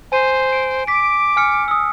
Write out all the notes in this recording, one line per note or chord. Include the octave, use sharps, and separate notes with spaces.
C5 G#5 D#7
D7
D6 B6 D7
G#5 F6 C#7
D#6 E6